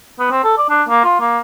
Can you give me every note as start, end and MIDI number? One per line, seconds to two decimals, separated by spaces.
0.19 0.27 59
0.31 0.41 60
0.44 0.54 69
0.58 0.66 74
0.70 0.83 62
0.89 1.03 58
1.04 1.19 65
1.20 1.39 58